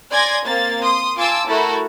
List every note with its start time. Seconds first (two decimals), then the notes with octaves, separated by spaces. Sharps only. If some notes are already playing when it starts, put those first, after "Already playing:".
0.11 D5 G#5 C6 G#6 A#6
0.44 A#3 C4 A6
0.82 C6 D#6
1.17 F4 G#5 A5 C6 D6 E6
1.47 A3 E4 F#4 A4 A#4